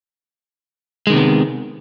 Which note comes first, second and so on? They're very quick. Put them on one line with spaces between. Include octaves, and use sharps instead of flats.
G#3 D#3 C3 B3